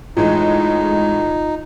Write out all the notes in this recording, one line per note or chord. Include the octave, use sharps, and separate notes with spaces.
A2 E3 G#3 D#4 F4